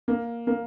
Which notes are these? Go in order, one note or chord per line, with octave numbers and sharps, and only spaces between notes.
A#3
A#3